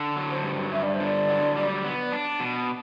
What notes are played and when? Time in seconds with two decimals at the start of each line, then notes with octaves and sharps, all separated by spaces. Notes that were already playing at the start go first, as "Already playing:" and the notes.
Already playing: D3
0.16 F#3
0.30 C5
0.43 G2
0.72 G2 E5
0.83 D5
0.94 C5
1.00 D3 D5
1.28 F#3
1.57 G3
1.85 B3
2.12 D4
2.40 B2